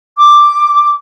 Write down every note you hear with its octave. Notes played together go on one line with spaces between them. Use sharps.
D6